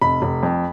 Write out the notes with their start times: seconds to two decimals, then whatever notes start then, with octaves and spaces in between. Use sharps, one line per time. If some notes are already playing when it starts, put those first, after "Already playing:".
0.02 F1 B5
0.22 F1
0.43 F2